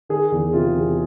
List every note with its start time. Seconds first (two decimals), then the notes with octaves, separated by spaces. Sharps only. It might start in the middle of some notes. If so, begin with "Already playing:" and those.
0.09 D#3 G#4
0.32 E2
0.53 C3 F4
0.75 E2